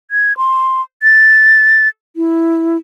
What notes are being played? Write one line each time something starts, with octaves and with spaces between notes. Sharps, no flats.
G#6
C6
A6
E4